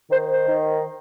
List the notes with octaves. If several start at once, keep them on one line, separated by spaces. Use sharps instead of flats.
D#3 C5
C5
D#3